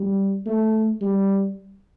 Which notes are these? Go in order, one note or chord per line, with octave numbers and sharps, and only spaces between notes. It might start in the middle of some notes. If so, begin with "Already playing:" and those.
Already playing: G3
A3
G3